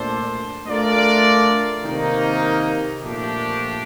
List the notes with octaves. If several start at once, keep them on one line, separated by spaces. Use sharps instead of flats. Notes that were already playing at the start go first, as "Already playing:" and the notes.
Already playing: A#2 A3 D4 A4 C5
A3 D4 F4 A#4 D5
C3 D#3 A#3 D#4
A#2 F3 A3 D4 G4